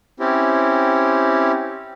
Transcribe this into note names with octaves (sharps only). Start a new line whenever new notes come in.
C4 C#4 E4 G4